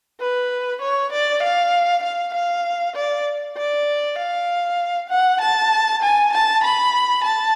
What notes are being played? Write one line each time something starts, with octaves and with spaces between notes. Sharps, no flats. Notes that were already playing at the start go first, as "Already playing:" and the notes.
B4
C#5
D5
F5
F5
F5
D5
D5
F5
F#5
A5
G#5
A5
B5
A5